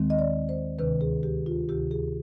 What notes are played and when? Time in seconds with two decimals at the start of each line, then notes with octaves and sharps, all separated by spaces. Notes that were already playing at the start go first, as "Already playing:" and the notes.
Already playing: D#2 D#3 G#3 C4
0.10 D#5
0.19 D5
0.49 C5
0.79 D2 C3 D#3 B4
1.01 G#4
1.23 G4
1.46 F4
1.69 D2 C3 D#3 G4
1.91 G#4